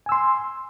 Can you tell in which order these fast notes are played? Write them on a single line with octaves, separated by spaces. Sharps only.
G#5 E6 C6